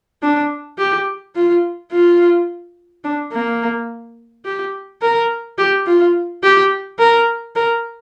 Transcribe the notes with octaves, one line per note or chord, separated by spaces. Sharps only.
D4
G4
F4
F4
D4
A#3
G4
A#4
G4
F4
G4
A#4
A#4